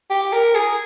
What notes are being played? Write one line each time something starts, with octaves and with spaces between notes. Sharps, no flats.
G4
A#4
G#4